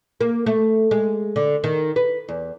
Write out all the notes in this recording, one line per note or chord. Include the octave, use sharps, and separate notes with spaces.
A#3
A3
G#3
D3
D#3
B4
E2